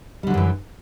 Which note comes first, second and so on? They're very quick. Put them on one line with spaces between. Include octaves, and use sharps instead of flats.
G3 D3 F#3 F#2 E3